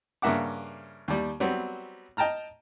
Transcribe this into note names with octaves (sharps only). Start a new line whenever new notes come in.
G2 C#3 A#3 E5 F#5 D6
D#2 G3
F#3 G3 B3 C4
D#5 G5 A5 A#5 F6